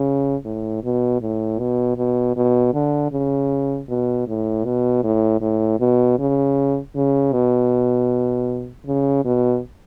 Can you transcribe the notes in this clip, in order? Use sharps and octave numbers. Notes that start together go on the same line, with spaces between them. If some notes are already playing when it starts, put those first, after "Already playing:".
Already playing: C#3
A2
B2
A2
B2
B2
B2
D3
C#3
B2
A2
B2
A2
A2
B2
C#3
C#3
B2
C#3
B2